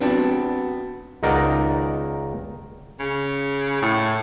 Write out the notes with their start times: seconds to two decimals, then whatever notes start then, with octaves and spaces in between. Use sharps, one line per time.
0.01 B3 C4 D4 F#4
1.23 C#2 D#3 D#4 A#4 D5 F#5
3.00 C#3
3.82 A2